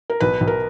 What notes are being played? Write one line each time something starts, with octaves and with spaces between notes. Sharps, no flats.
A#4
B1 B4
B1
A#4